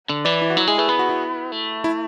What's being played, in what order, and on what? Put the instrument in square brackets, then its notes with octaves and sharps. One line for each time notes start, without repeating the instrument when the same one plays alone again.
[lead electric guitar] D3
[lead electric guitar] E3 [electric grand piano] B4 D5
[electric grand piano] E4
F#4
[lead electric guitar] F#3 [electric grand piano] E4
[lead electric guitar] G#3 [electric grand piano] E4 G#4
[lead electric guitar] A3 [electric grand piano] G#4 B4
[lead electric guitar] B3 [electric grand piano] G#4 B4
[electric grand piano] F#4
E4
[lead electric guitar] A3
[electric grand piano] E4